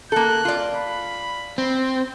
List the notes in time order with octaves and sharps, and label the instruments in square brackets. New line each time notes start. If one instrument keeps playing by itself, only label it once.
[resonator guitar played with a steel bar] A#3 A4 [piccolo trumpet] F#6
[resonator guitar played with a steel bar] F4 D5
[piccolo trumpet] B5
[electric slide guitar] C4